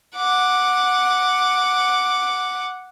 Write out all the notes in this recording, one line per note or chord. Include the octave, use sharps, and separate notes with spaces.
F#5 D6